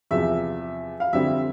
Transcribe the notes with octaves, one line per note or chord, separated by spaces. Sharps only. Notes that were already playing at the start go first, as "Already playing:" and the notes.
E2 C3 F3 E5
F5
F2 D3 G3 C4 E5